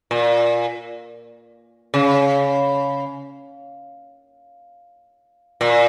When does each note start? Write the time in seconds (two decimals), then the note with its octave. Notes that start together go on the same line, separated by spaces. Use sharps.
0.11 A#2
1.94 C#3
5.61 A#2